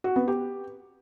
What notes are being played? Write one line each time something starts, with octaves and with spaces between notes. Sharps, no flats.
F#4
B3
G4